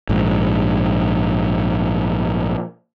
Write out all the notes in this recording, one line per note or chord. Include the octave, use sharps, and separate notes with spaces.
A#1 G#2